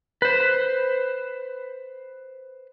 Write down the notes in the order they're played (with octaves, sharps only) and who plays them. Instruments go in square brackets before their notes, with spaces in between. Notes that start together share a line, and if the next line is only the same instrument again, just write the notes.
[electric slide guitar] B4 C5